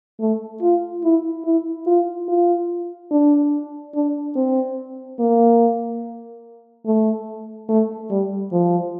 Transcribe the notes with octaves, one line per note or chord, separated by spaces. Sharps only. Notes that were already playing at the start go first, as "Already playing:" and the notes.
A3
F4
E4
E4
F4
F4
D4
D4
C4
A#3
A3
A3
G3
F3